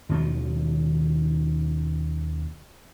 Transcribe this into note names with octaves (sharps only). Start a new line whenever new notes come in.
D#2 B2 D#3 F3